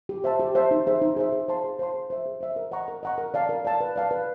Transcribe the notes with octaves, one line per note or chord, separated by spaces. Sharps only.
G4
C5 E5 A5
G4
C5 E5 A5
D#4
G#4 C5 E5
D#4
G#4 C5 E5
G#4
C5 F5 A5 C6
G#4
C5 F5 A5 C6
G#4
C5 E5
G#4
C5 E5
A#4
D#5 F#5 A#5 C#6
A#4
D#5 F#5 A#5 C#6
A#4
D5 F5 A5
A#4
D5 F5 A5
B4
D5 F5 A5
B4